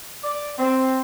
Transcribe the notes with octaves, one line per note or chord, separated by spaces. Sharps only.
D5
C4